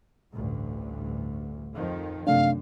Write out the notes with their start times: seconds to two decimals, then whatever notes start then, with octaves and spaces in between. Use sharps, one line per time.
0.32 A1 D2 G2
1.74 F2 D#3 F3
2.27 F#2 C3 A3 D4 F5